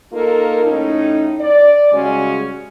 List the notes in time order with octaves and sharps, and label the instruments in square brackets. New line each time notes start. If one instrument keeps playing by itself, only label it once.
[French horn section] A#3 D#4 F4 A4 A#4
A2 C#4 D#4
D5
C#3 G3 G#3 C#4 F#4